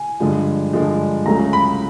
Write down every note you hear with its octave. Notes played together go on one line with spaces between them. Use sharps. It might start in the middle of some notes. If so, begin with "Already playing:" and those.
Already playing: G#5
G2 D3 F3 G#3
G2 D3 F3 G#3
C#2 C#3 F#3 A3 A#5
B5